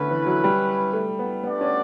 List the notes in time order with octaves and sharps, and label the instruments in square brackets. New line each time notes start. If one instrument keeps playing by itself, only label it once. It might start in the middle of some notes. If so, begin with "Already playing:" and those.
Already playing: [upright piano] D3 A3 B3 [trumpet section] C#4 E4 B4
[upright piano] E3
F#3
G3
A3
B3
[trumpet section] A3 D4 G4 D5 F#5 [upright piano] B3
[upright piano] C#4